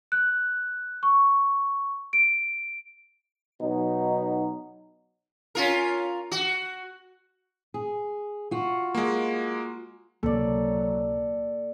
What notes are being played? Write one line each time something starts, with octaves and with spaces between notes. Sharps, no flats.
F#6
C#6
D7
B2 F#3 D#4
C#4 F4 A#4
F#4
G#4
F4 F#4
G#3 A#3
C#2 C3 F#3 A#3 A4 D5